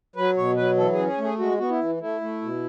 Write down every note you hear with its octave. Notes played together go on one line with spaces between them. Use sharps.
F#3 B4
B2 C#5
F#3 B4
E3 A4
G#4
C#4
G#4
A3
G#4
G#3 F#4
B3 F#4
E4
E3
A3 E4
A3
B2